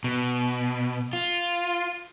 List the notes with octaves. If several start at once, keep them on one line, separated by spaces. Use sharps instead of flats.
B2
F4